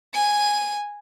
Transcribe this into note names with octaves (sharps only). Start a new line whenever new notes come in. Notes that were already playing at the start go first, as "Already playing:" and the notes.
G#5 D#7